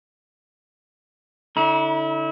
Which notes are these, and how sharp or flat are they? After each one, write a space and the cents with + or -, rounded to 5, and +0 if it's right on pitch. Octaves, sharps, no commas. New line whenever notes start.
D3 +0 E4 -30 A#5 +45